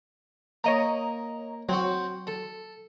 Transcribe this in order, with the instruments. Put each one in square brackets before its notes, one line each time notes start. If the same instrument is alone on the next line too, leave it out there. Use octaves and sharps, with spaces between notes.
[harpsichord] A#3 [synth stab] C#5 D#5 A#5
[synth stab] F#3 [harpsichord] C4 F#4
[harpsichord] A4